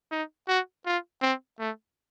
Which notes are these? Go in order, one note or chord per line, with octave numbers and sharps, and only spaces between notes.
D#4
F#4
F4
C4
A3